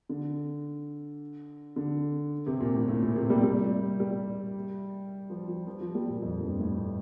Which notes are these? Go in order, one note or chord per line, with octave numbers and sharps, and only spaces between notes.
D3
D3
C3
A#2
A2
A2
A#2
C3
G3
G3
G3
F3
F3
F3
F3
G3
A#2
F2
G2
A2